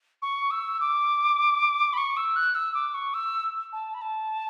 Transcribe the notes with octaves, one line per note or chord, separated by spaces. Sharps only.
C#6
E6
D6
B5
C#6
E6
F#6
E6
D6
C#6
E6
A5
B5
A5